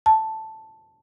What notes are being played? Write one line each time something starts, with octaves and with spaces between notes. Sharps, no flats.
A5